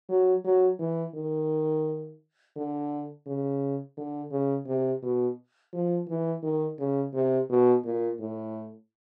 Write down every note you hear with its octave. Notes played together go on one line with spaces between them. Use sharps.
F#3
F#3
E3
D#3
D3
C#3
D3
C#3
C3
B2
F3
E3
D#3
C#3
C3
B2
A#2
A2